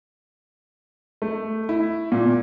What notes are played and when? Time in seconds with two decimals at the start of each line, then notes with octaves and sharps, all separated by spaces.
1.22 A3
1.69 E4
2.12 A#2